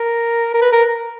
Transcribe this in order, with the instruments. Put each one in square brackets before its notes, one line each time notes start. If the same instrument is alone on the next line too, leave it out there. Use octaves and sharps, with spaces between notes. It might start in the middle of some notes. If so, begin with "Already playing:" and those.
Already playing: [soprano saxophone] A#4
A#4
B4
A#4